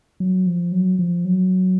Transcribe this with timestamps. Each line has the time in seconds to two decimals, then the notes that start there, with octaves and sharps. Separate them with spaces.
0.20 F#3
0.46 F3
0.72 F#3
0.99 F3
1.25 F#3